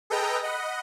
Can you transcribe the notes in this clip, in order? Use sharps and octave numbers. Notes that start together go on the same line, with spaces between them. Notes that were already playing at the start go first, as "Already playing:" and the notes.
G#4 A4 B4 D#5 G5 A#5
D#5 F#5 B5